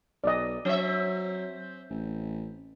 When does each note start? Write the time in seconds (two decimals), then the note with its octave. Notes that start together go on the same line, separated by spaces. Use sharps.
0.24 B1 D5 D#5
0.65 F#3 C4 E5
1.90 A1